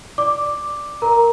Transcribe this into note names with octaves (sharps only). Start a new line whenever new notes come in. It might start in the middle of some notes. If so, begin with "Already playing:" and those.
D5 D6
A#4 A#5